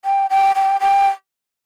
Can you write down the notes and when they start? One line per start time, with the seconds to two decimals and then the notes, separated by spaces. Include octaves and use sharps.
0.05 G5
0.30 G5
0.55 G5
0.81 G5